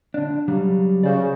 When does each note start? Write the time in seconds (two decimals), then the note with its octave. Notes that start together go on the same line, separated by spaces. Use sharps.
0.14 D3 D4
0.48 C#3 F#3 G3
1.03 C#3 F#4 C5 D5